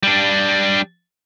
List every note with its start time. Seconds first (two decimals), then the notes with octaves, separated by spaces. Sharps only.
0.03 G3 D4